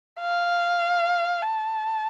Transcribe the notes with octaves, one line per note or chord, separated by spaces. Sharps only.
F5
A5